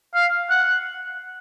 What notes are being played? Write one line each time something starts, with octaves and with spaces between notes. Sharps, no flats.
F5
F#5